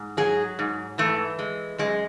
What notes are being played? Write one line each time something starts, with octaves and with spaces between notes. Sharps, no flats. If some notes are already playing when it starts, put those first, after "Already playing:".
Already playing: G#2
F#3 G#4
G#2
E3 A3
G#3
F#2 G#3